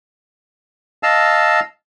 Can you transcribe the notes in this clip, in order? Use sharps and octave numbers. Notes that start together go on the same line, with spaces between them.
D#5 F5 A5 E6